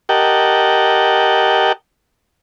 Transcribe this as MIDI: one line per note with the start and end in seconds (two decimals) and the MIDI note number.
0.09 1.72 67
0.09 1.72 70
0.09 1.72 75
0.09 1.72 78
0.09 1.72 79
0.09 1.72 81